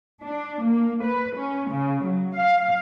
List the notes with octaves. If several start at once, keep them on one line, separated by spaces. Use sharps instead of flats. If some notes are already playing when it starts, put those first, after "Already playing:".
D4
A#3
B4
C#4
C#3
F#3
F5